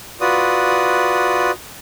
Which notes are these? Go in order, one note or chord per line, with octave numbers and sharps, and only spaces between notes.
F4 F#4 B4 D5 D#6